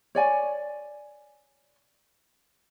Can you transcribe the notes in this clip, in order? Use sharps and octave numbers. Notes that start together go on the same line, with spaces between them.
C#5 D5 G#5